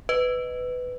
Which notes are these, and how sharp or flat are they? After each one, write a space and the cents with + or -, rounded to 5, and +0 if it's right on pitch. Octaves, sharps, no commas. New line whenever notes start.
B4 +15 D#5 +0